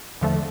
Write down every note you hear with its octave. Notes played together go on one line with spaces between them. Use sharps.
E2 D3 F3 A3